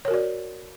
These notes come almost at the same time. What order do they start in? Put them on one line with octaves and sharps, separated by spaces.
C#5 A#4 F#4 D5